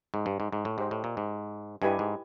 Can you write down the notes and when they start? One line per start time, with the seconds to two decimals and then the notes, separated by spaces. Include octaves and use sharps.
0.14 G#2
0.26 G2
0.40 G#2
0.52 G#2
0.65 A2
0.78 G#2 G4 C5 D#5
0.91 A2
1.04 A#2
1.17 G#2
1.82 G2 E4 G4 B4 D#5 G#5
1.99 G#2